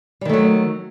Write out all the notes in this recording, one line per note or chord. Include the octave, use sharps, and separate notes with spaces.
D#3 F#3 G3 A3